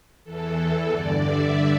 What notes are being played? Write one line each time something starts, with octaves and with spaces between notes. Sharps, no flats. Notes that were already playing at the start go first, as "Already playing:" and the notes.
E2 E3 A4
G2 D3 D5
E5